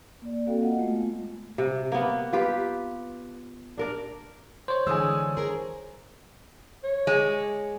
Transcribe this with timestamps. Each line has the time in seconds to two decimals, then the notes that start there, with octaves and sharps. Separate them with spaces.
0.22 A#3 D5
0.47 A#3 C4 F#4 A4 F5 G5
0.61 F4 D#5 F5 F#5
0.78 G#3 A3 B3 F4
1.58 C3
1.92 A#3 B3
2.33 F4 G4 B4
3.77 D4 A#4 D5
4.68 C5 C#5
4.87 D3 E3 G#3 G#5 D#6 E6
5.37 G#4 A#4
6.84 C#5
7.07 G#3